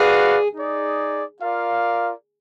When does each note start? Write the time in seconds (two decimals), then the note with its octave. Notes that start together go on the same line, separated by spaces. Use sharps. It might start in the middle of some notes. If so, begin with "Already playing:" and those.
Already playing: F#4 G#4 B4 D5 F5
0.55 D#4 G#4 D5
1.42 F4 A#4 D5 F5